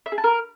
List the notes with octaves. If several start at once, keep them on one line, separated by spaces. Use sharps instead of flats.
E5
G#4
A5
A#4